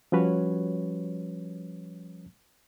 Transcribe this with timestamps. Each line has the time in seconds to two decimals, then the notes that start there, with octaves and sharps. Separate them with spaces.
0.12 F3 G3 C#4 F#4 B4 C#5